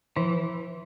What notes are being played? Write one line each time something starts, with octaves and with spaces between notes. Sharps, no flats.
E3 F3